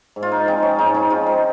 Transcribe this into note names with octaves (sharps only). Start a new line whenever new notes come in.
G#2
F4
D#4
F3 G#3 C4 D#4
C#4
G#2 D#4
D#4
F3 G#3 C4 F4
D#4